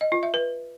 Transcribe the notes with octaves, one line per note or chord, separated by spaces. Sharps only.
D#5
F4
E5
B4